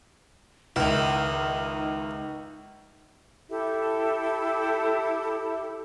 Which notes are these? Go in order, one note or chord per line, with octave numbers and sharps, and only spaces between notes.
C#2 D#3 D#4 E4
E4 G4 A4 E5